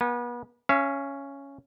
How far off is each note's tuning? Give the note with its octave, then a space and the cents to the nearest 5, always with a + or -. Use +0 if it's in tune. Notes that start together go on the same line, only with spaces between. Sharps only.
B3 -35 G#5 -30
C#4 +0 F5 -45